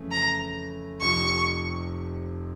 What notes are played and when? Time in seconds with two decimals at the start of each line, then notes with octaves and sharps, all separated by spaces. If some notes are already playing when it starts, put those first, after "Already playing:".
Already playing: F2 C#3 E3 A3
0.11 A#5
1.02 F1 F2 C3 F3 C#6